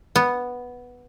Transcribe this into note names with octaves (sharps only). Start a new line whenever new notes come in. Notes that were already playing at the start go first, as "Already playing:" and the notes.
B3